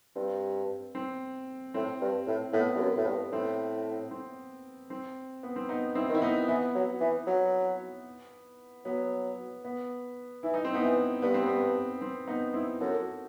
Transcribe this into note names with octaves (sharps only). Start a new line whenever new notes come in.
G2 C4
C4
A2 C4
G2
A2
A2 B3
G2
F#2
A2
G2
A2 C4
C4
C4
B3
C4
B3 D#4
C4 E4
D#3
E4
B3 D#4
E3 B3
F#3
E3
F#3
F#3 B3
B3
E3 E4
D#4
C4
B3 D#4
E3
G2 B3
C4
B3
C4
B3 D#4
C4 E4
F#2 F#4 A4